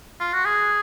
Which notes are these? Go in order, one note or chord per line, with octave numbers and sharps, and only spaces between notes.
F4
F#4
G#4